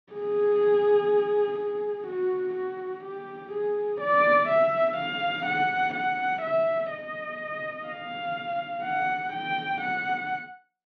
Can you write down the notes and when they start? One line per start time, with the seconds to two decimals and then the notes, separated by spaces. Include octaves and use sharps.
0.13 G#4
1.59 G#4
2.07 F#4
2.55 F#4
3.04 G4
3.52 G#4
4.01 D5
4.48 E5
4.97 F5
5.46 F#5
5.94 F#5
6.42 E5
6.91 D#5
7.87 F5
8.84 F#5
9.33 G5
9.81 F#5